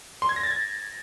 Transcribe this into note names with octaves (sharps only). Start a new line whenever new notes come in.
C6
G#6
A#6
A6
G#6